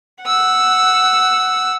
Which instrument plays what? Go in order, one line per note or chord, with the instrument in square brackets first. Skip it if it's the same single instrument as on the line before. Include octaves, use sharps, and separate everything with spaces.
[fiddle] F#5 E6